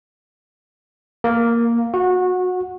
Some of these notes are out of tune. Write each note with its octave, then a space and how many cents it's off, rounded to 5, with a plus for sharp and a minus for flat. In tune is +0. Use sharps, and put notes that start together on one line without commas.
A#3 +0 A#4 +0
F#4 -25 F#5 -10